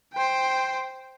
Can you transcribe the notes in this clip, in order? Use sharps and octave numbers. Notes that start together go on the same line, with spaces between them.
C5 G5